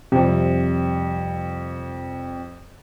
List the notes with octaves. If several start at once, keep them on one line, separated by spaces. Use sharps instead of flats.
F2 C3 G3